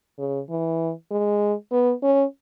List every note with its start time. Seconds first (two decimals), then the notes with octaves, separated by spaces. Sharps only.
0.19 C#3
0.50 E3
1.11 G#3
1.72 B3
2.03 C#4